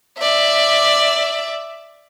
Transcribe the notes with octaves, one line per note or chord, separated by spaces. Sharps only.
D5 E5